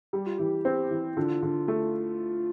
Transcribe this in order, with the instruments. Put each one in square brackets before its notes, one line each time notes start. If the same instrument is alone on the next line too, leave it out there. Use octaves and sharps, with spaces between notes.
[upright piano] G3 [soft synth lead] G4
[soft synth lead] F4
[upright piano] E3 [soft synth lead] G4
[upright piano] C4
E3
[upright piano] D3 [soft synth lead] F4
[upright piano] D3
A3